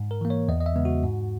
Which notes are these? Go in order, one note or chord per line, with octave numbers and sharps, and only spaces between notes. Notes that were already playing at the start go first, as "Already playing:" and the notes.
Already playing: G#2
A#4
E3 A#3
C#5
E2 D#5
D#5
E5
C#3 G#3 B3
F#4
G#2